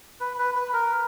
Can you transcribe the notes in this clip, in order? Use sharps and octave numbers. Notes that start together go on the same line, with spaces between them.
B4
B4
B4
A#4